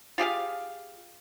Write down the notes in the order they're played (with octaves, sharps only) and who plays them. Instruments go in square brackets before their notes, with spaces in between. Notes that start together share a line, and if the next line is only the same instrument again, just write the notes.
[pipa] F4 G4 G#4 F5